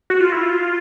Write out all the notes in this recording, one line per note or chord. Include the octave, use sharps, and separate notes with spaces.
F#4
F4
E4
F4